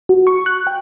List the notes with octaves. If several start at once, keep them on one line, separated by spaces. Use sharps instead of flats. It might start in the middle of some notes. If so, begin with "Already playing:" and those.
F#4
C#6
F#6
G5